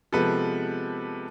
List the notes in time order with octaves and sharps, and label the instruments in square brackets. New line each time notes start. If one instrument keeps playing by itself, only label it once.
[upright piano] C3 F3 G#3 B3 A4 B4